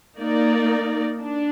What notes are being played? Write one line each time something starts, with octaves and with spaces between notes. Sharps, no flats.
A#3 D#4 A#4 D5
D4